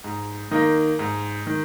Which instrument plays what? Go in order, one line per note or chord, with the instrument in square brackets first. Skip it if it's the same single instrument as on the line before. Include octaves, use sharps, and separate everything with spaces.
[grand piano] G#2
D#3 A#3 D#4
G#2
D#3